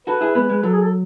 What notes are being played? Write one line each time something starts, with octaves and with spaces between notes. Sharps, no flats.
F#4 A4 B4
E4 G#4
G#3 B3 B4
G#3
F#3 A4
G#4
A4